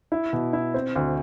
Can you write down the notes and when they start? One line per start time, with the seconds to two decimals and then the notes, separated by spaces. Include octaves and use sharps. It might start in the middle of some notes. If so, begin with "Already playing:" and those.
0.12 E4
0.33 B2
0.53 E4
0.74 C4
0.96 D2